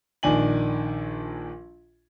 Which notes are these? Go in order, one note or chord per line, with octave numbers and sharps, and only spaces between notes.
A#1 D#3 D4 G#5 F#7